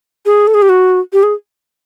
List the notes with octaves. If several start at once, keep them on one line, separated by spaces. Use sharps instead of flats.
G#4
A4
G#4
G4
F#4
G4
G#4